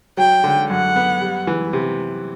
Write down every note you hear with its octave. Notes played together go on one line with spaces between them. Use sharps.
F#3 G5
D3
F#2 F#5
B3
G3
E3
C3